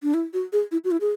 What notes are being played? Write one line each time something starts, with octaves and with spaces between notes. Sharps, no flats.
D4
E4
F#4
G#4
E4
F#4
E4
G#4